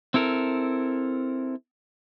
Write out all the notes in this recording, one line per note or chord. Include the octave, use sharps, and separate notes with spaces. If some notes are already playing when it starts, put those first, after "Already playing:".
C4 E4 A4 A#4